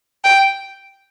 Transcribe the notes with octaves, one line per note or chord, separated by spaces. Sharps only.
G5